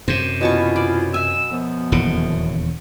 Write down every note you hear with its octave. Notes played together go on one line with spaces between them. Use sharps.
F#2 C3 C5
B2 C#4 E4 F4 A5 C#6
D5
G#5 E6
F#2 F3 B3
D#1 E2 C#3